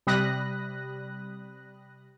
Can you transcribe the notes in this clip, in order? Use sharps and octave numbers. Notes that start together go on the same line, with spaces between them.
C3 G3 B5 D#6 F#6 A#6